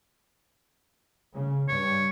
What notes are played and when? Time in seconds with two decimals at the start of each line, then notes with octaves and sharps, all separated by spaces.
1.33 C#3
1.68 G2 C#5